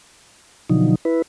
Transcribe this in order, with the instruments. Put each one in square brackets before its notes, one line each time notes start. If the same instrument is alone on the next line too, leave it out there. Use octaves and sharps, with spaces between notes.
[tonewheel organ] B2 D3 F3 F#3 D#4
E4 B4